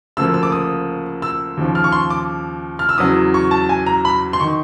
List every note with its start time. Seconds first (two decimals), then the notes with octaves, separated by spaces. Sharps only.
0.17 D2 C#3 F3 A#3 E6
0.34 E6
0.43 D6
0.52 D#6
1.22 E6
1.57 D#2 C#3 F3
1.75 F6
1.84 C#6
1.92 C6
2.10 D6
2.79 F6
2.89 E6
2.98 E2 C#3 F#3 D#6
3.34 C#6
3.51 A5
3.69 G#5
3.86 A#5
4.05 B5
4.33 C6
4.40 D#3 C#6